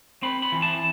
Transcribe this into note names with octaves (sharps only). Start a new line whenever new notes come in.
C4 B5
B5
E3
A5